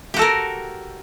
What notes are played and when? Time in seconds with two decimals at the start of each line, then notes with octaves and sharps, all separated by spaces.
0.14 G4
0.17 F#4
0.19 A4
0.22 A#4